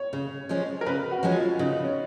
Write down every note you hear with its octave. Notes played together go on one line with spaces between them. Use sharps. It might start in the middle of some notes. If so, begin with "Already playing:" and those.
Already playing: C#5
C#3
F3 G#3 C#4
A#4
C#3 B4
F#4
F3 G#3 C#4
F4
C#3 D#4
C#4